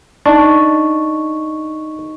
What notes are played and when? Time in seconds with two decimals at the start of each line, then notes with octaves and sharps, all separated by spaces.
0.26 D4 D#4 D#5 C#6